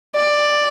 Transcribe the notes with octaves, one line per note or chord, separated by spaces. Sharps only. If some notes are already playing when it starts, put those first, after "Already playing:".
D5